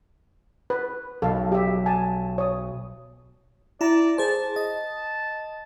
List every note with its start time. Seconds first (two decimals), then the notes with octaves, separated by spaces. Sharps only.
0.70 B4
1.22 B1 A4 F5
1.52 G4 E5
1.86 G#5 A5
2.38 C#5 D#6
3.81 E4 D5 A#5
4.18 G#4 C5 A5
4.56 D#5